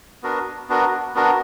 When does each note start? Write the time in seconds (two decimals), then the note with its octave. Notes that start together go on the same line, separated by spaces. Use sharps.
0.23 B3 D4 F#4 A#4
0.69 B3 D4 F#4 A#4
1.15 B3 D4 F#4 A#4